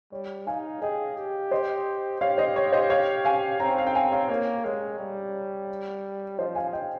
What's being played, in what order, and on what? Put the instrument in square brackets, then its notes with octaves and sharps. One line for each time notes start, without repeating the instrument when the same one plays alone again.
[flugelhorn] G3 [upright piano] C#5
[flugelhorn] D#4 [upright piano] F5 G#5
[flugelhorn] G#4 [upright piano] D#5 G5
[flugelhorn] G4
[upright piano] C5 D#5
[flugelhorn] G4 [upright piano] C#5 F5
[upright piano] C5 D#5
C#5
C5 D#5
C#5 F5
F5 G#5
[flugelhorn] C4 [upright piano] G5 A#5
[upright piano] F5
G5
F5 G#5
C#5 F5
[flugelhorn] A#3 [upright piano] C#5
[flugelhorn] G#3 [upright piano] C#5
[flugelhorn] G3
[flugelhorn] F3 [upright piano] C5 D#5
[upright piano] F5 G#5
D#5 G5